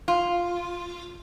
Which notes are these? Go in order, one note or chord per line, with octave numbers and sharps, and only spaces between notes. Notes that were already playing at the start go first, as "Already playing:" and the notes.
F4